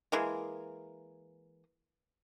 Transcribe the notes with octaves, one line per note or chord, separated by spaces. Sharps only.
E3 G#3 A#3